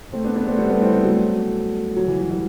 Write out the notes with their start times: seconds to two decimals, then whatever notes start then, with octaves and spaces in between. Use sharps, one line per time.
0.13 A3 C4
0.24 B3 D4
0.36 B3 D4
0.47 A3 C4
0.59 G3 B3
0.70 A3 C4
0.81 C4 E4
0.93 G3 B3
1.04 F#3 A3
1.96 F#3
2.08 E3
2.20 F#3
2.31 E3 G3